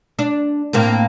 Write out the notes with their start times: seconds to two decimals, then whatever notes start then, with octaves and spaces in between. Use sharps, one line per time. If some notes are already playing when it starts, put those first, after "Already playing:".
0.19 D4
0.73 A2 A#3 C4